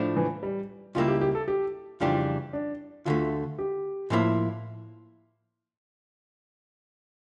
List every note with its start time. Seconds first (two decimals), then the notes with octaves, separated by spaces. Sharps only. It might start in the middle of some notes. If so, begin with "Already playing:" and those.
Already playing: A2 F3 A3 D4
0.16 E3
0.43 G3
0.95 C#2 C#3 G3 A#3 E4 F4
1.08 G4
1.21 G4
1.35 A4
1.48 G4
2.00 F2 C#3 E3 G3 D4 F4
2.53 D4
3.05 D2 D3 A3 F4
3.59 G4
4.10 A2 F3 A#3 E4